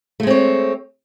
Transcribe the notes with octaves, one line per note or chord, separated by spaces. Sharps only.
G#3 A3 C4 C#5